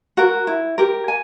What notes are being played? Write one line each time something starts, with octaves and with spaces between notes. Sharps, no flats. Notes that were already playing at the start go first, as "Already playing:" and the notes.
F#4 A#4
E4
G4 A#4
G#5